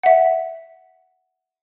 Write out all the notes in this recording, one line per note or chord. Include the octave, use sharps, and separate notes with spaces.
E5 F#5